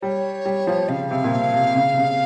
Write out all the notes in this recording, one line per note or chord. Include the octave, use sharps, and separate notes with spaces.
G3 C#5
G3
F3
C#3 F5
C3
A#2
C3
C3
C#3
C3
C#3